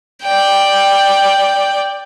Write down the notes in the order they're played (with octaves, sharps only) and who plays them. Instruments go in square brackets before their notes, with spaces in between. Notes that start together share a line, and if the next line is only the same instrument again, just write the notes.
[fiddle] D5 G5